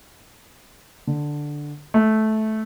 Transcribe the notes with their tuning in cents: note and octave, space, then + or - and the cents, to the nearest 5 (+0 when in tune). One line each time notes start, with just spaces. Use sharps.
D3 +5
A3 -15